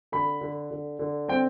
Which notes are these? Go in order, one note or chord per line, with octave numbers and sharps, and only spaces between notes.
D3 B5
D3
D3
D3
C4 G5